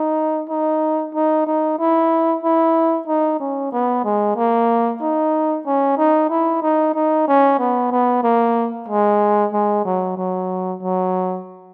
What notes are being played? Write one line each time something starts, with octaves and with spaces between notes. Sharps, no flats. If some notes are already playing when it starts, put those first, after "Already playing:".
Already playing: D#4
D#4
D#4
D#4
E4
E4
D#4
C#4
B3
G#3
A#3
D#4
C#4
D#4
E4
D#4
D#4
C#4
B3
B3
A#3
G#3
G#3
F#3
F#3
F#3